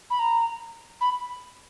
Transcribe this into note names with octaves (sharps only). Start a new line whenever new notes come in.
B5
A#5
B5